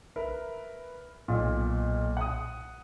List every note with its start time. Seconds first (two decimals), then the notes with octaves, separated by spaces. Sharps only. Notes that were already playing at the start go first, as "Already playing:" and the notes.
0.16 A#4 B4 E5
1.28 B1 A#2
2.17 F#5 D#6